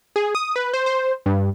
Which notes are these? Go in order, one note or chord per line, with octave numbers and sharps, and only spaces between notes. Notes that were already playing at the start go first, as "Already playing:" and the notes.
G#4
D#6
B4
C5
C5
G2